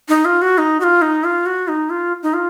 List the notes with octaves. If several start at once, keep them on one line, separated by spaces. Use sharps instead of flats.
D#4
F4
F#4
D#4
F#4
F4
D#4
F4
F#4
D#4
F4
D#4
F4